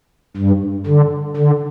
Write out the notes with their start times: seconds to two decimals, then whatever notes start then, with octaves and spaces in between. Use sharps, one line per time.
0.37 G2
0.86 D3
1.36 D3